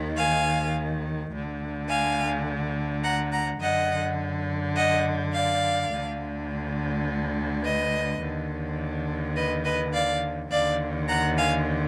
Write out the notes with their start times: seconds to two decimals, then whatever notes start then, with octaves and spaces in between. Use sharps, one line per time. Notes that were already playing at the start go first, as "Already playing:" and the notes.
Already playing: D#2 D#3
0.16 F5 G#5
1.31 D2 D3
1.88 F5 G#5
3.03 F#5 A#5
3.32 F#5 A#5
3.61 F#2 D3 D#5 F#5
4.76 D#5 F#5
5.33 D5 F5
5.91 D2 D3
7.63 B4 D#5
8.21 D#2 D3
9.36 B4 D#5
9.65 B4 D#5
9.93 D5 F5
10.51 D#2 D3 D5 F5
11.08 F#5 A#5
11.37 F5 G#5